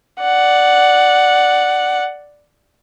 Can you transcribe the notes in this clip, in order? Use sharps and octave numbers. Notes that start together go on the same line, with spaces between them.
D5 F#5